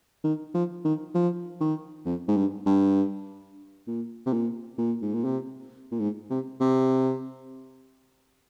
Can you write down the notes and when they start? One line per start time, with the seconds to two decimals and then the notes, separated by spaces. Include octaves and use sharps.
0.24 D#3
0.54 F3
0.85 D#3
1.14 F3
1.60 D#3
2.06 F2
2.28 G#2
2.37 G2
2.66 G2
3.87 A#2
4.26 C3
4.33 A#2
4.78 A#2
5.02 G#2
5.14 A#2
5.24 C3
5.92 A#2
6.00 G#2
6.30 C3
6.61 C3